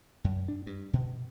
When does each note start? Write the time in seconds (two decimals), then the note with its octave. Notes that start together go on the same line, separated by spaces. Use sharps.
0.24 F#2
0.48 D4
0.66 G2
0.93 B2